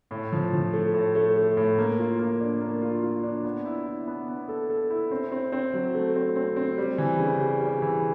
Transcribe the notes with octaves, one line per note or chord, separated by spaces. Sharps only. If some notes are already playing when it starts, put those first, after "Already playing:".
A2
F3
F3
A3
A2
A3
A3
A2
A#3
F4
A#3
D4
A#3
F4
F4
D4
B3
E4
E4
B3
B3
A4
A4
E4
C4
C4
C4
F#3
A3
C4
C4
C4
G3
E3
C#3
G3
G3
E3